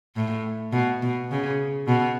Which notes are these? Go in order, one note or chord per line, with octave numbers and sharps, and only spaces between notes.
A2
B2
B2
C#3
B2